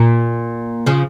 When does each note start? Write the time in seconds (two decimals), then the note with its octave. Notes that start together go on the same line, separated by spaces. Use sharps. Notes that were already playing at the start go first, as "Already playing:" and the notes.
Already playing: A#2
0.86 C#3 F3